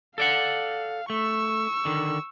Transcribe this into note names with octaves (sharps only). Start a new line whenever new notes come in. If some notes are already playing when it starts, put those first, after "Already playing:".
A4 D5 F5 F#5
A3 C#6 E6
D3 D#3